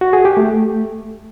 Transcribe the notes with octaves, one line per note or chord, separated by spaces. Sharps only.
F#4
G#4
G4
A3